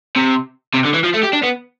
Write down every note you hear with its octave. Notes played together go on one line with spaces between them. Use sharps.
C3
C3
D3
E3
F3
A3
G4
D4
B3